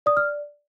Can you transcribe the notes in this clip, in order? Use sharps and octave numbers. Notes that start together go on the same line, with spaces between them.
D5 D#6
F6